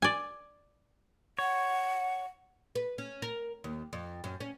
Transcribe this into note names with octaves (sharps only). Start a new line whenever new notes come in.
D5 G#5
C#5 F#5
B4
C#4
A#4
D#2
F2
F#2
C#4